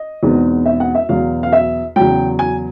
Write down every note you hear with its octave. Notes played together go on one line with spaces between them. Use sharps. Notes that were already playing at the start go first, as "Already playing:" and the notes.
Already playing: D#5
E2 B2 G#3 C4 D#4
E5
F#5
E5
E2 B2 F#3 F5
F5
E5
E2 C#3 F#3 G5
G#5